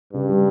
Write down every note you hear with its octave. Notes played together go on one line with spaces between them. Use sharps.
G2 C#3
G3